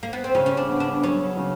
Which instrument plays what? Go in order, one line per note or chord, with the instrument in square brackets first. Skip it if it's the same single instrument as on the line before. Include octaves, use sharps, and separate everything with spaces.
[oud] A#3
B3
C4
[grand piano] C#3 [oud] C#4
[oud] C#4
D4
[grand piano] B3
[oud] D4
[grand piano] F#3 [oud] C#4
[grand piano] C#3